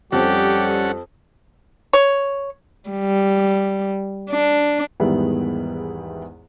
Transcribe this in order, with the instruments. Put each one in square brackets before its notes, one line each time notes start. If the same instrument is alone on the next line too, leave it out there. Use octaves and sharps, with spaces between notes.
[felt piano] F2 [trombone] G3 [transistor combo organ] C#4 A4 F#5 [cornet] G4
[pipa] C#5
[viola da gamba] G3
D4
[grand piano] E2 G#2 D#3 G3 B3 E4